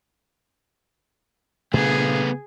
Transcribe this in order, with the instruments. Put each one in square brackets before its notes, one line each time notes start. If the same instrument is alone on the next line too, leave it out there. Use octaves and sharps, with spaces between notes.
[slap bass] A#2 D4 [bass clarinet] C#3 [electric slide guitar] A3 B3 [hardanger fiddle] G#4